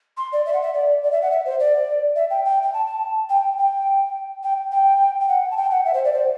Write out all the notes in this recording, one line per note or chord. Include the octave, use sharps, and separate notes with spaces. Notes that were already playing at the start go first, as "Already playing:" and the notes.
C6
D5
E5
F#5
E5
D5
D5
E5
F#5
E5
C5
D5
E5
G5
G5
G5
A5
A5
G5
G5
G5
G5
G5
F#5
A5
G5
F#5
E5
C5
D5
C5